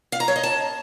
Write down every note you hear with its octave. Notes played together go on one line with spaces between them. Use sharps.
F5
A#5
C#5
D#5
A5